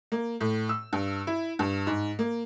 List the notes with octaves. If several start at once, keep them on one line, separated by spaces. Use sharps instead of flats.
A#3
A2
E6
G2
E4
G2
G#2
A#3